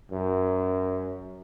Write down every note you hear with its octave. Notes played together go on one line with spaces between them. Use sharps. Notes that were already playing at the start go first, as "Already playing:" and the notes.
F#2